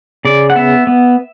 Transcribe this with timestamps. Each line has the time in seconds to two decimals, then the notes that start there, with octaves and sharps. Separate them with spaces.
0.25 C#3 D5
0.50 F#5
0.56 B3 E5
0.87 B3